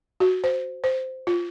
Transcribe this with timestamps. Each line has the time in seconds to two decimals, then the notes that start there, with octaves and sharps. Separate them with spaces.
0.20 F#4
0.44 C5
0.84 C5
1.27 F4